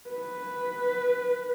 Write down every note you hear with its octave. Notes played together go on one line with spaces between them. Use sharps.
B4